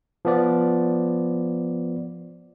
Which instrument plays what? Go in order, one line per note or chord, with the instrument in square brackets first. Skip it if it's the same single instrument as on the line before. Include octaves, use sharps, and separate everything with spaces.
[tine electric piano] F3 B3 D5